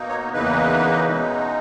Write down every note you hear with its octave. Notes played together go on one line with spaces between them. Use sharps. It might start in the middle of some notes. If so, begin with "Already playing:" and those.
Already playing: B2 A#3 D#4
C#5
E2 C#3 E3 A#3 D#4 B4
B2 G#3 D#4